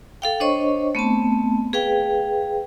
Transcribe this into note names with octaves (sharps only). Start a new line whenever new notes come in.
A4 F5 G5
D4 C5 C#5 D#5 C#6
A3 B3 C4 A5
G#4 B4 F5 G5